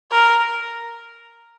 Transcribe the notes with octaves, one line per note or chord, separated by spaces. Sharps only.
A#4